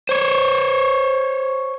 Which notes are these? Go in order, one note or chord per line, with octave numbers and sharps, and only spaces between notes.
C5 C#5